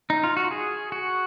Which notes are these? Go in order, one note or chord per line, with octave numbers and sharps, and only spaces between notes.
D#4
F4
F#4
G#4
F#4